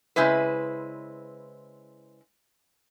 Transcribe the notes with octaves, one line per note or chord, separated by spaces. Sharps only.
C#3 G#3 C4 E4 B4